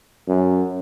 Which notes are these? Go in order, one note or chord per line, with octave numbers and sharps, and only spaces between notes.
F#2